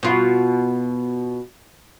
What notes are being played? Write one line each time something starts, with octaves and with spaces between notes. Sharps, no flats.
B2 F4